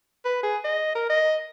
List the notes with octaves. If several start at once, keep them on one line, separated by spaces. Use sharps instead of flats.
B4
G#4
D#5
A#4
D#5